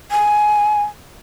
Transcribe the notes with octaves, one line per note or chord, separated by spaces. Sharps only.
G#5